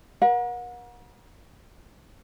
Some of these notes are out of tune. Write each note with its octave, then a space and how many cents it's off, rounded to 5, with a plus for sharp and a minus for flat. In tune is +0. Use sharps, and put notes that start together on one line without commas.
A#4 +40 F#5 -35